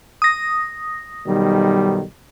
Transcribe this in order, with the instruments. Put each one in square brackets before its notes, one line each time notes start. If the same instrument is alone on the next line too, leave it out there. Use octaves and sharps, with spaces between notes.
[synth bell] D#6 A#6
[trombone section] B1 D#3 G3